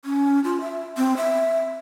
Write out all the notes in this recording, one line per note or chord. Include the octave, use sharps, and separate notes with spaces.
C#4
F4
E5
C4
E5